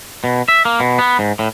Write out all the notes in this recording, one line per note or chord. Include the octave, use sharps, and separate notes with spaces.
B2
E5
A#3
B2
B3
G#2
A2